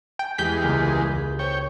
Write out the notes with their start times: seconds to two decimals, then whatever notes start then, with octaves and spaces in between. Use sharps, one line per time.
0.19 G5
0.38 E2 G#3 G4 G6 B6
0.62 C#2 A#3 F6
1.39 C5 C#5 G5